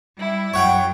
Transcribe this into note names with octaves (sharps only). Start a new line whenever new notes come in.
G3 E4
F#2 C#5 F#5 G5